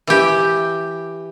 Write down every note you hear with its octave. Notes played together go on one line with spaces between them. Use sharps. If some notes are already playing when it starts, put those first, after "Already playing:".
E3 G4